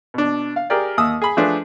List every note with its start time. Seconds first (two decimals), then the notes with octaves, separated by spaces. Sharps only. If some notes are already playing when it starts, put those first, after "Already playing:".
0.14 B2 D4
0.56 F5
0.70 G4 G#4 A#4 D5 G5
0.97 D#2 D#6 E6
1.22 G#4 B5
1.37 F3 A3 D4 G#4 B4